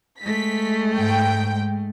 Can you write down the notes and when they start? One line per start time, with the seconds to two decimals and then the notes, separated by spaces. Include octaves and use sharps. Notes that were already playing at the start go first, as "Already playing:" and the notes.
0.21 G#3 A3 B6
0.96 G#2 G5